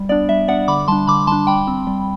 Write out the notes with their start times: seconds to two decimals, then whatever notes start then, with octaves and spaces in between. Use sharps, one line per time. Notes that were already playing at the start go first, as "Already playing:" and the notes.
Already playing: G3
0.09 B3 D4 D5
0.29 G3 E5
0.48 B3 D4 D5 F#5
0.68 D3 B5 D6
0.88 G3 A5 C6
0.92 D4
1.07 D3 B5 D6
1.27 G3 D4 A5 C6
1.47 G3 G5 B5
1.67 C4
1.87 G3